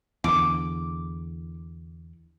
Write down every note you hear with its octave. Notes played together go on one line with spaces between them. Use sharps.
E2 D3 D6